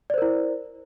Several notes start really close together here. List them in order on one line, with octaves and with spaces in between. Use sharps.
D5 C5 A#4 E4